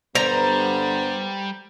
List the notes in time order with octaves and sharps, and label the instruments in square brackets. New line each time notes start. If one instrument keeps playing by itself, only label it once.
[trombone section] G2 D3 B3 [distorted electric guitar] G3 [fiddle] C5 [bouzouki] A#5